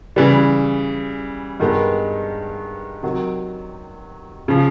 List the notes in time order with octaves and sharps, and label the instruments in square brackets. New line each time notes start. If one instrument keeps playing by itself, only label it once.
[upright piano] C#3 E3 G3
G2 D#3 G#3 B3
C3 D#3 F#3
C#3 F3